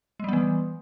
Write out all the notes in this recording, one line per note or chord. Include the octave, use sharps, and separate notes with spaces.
E3 G3 G#3 B3